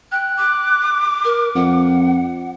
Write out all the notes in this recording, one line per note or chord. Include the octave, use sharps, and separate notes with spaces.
G5 F#6
D6
A#4
F2 F#5